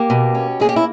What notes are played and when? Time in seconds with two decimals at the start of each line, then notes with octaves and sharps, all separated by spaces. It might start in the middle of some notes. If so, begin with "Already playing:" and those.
Already playing: A#3 G4
0.10 B2
0.35 C#4
0.60 A#3 G#4
0.69 G4
0.76 E4